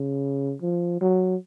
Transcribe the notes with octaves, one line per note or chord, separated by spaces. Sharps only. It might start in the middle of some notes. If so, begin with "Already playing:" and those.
Already playing: C#3
F3
F#3